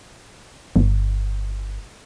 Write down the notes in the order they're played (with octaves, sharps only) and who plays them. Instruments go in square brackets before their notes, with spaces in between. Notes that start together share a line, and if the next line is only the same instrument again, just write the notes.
[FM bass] G1